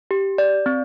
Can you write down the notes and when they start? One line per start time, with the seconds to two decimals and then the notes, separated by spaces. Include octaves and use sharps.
0.11 G4
0.38 D5
0.66 C4